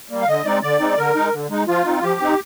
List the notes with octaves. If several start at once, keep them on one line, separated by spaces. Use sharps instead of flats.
G3 A#3
F5
D3 D#5
G#3 C4 D#4 D5
D3 D5
G#3 C4 D#4
D3 A#4
G#3 D#4
D3
G#3 D#4
F3 F4
C4 D#4
F3 G4
C4 D#4